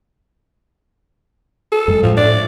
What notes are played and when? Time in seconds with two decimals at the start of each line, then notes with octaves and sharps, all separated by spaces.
1.72 A4
1.88 F#2 G#3
2.03 A2 F3
2.17 D5